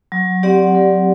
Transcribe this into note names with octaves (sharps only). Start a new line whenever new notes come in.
F#3
C4 G4 D5 F#5
F#3